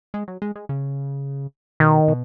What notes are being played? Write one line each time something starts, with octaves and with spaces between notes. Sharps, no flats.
G#3
F#3
G#3
G#3
C#3
B2 D#3
B2